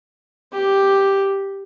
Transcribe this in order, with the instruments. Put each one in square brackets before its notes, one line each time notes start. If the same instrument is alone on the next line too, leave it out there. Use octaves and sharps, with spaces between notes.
[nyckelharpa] G4